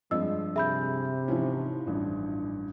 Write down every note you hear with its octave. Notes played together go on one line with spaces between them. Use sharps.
G2 F3 G#3 C4 D#5 E6
C3 G#4 E5 B5 G6
G#2 E3 F3 C#4
A1 G2